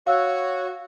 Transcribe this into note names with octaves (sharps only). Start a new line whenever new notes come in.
F#4 C#5 F5 E6